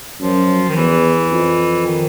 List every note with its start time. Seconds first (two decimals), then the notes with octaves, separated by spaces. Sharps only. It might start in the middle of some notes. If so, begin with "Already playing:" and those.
0.21 F#2 F3
0.69 D#3
0.76 E2 E3
1.32 F2
1.86 D#3